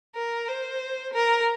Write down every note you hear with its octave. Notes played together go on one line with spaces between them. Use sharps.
A#4
C5
A#4